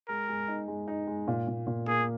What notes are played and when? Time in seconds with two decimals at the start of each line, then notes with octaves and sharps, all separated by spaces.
0.08 G#3 A#4
0.28 G#3
0.48 D#4
0.68 G#3
0.88 D#4
1.07 G#3
1.28 A#2
1.48 A#2
1.67 A#2
1.87 A#3 G#4